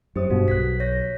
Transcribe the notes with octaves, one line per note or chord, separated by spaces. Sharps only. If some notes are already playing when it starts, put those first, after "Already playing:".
F#2 G4 C5 D#6
G2 B2 F#4
B1 F#6 G#6 B6
C#5 G6 A#6
B6